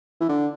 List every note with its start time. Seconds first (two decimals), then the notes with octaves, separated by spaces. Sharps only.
0.21 E3
0.29 D3